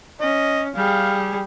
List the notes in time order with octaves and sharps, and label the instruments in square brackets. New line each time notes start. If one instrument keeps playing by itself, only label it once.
[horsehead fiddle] C#4 [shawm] D#5
[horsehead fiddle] G3 G#4 [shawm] F5